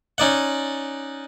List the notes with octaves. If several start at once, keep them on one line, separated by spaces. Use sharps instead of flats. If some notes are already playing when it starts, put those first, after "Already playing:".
C#4 D#4 D5 F#5